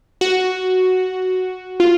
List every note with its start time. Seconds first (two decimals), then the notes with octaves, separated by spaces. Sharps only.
0.21 F#4
1.80 F4